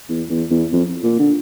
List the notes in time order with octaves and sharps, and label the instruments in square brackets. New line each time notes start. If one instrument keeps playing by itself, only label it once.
[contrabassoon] E2
E2
E2
F2
A#2
D3